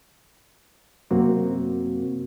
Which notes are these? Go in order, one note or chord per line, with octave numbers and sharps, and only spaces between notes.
F#2 C3 A#3 C4 F#4